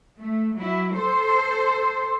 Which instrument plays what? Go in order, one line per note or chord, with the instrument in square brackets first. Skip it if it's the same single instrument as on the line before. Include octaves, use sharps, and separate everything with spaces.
[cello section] A3
F#3 E4
[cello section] A4 C5 [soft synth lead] C6